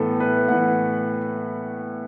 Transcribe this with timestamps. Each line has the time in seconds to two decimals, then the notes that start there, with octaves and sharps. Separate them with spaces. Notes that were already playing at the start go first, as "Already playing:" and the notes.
Already playing: A2 E3 B3 A4
0.20 B4
0.48 A2 E3 F#5